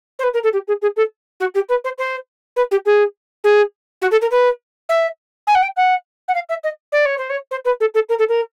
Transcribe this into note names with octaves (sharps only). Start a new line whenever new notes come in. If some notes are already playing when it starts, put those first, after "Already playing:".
C5
B4
A#4
A4
G4
G#4
G#4
A4
F#4
G4
B4
C5
C5
B4
G4
G#4
G#4
F#4
A4
A#4
B4
E5
G#5
F#5
G5
F#5
F#5
F5
E5
D#5
D5
C#5
C5
C#5
C5
B4
A4
A4
A#4
A4
A#4